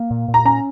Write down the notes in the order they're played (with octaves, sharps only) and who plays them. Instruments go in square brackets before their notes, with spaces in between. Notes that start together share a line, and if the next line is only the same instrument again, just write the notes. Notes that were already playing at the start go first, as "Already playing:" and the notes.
Already playing: [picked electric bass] A#3
A#2
A#2
[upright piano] A#5
[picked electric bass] C#4 [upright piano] A#5